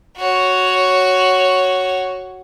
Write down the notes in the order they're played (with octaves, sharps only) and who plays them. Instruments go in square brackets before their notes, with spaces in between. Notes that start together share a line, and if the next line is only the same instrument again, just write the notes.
[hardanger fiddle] F#4 C#5